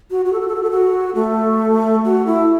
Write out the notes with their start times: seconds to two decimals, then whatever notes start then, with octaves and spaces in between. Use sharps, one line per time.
0.11 F#4
0.25 F#4
0.33 A4
0.41 F#4
0.48 A4
0.55 F#4
0.63 A4
0.71 F#4
1.15 A3
2.05 F#4
2.26 E4